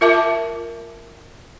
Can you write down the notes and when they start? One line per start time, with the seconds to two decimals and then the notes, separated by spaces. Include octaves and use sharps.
0.01 F4 A#4 E5 A5 D6